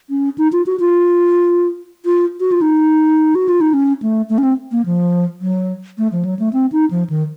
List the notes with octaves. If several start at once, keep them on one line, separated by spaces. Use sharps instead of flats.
C#4
D#4
F4
F#4
F4
F4
F#4
F4
D#4
F#4
F4
D#4
C#4
A3
A3
C#4
C4
A#3
F3
F#3
A3
F3
F#3
A3
C4
D#4
F3
D#3